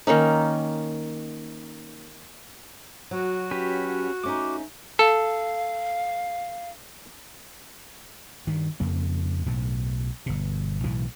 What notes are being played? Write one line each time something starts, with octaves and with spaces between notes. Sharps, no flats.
D#3 A#3 C#4 D#4
F#3 F#4
C#4 G4 B4
A3 C#4 D#4 D6
A4 F5
G2 D#3
F2 C#3 A#3
B1 A2
G1 B2
B1 A2 E3